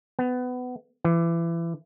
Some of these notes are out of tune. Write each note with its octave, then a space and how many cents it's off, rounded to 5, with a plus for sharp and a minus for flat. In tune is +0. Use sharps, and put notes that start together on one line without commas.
B3 +20
E3 +25